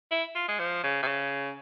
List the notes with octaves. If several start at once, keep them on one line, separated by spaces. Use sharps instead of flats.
E4
F4
G#3
F3
C#3
C3
C#3